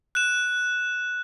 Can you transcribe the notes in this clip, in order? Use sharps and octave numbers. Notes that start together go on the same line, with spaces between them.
F#6 E7